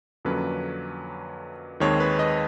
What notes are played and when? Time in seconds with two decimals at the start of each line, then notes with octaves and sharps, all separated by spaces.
0.25 F2 D3 F#3 A#3 C#4 B4
1.80 D#2 D#3 G#3 C4 C#5
2.00 B4
2.19 D#5